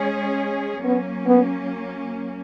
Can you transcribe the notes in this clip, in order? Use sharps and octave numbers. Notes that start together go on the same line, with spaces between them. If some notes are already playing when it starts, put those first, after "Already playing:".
Already playing: G#3 C#4 G#4 C#5
F#3 A#3 B3 C#4
B3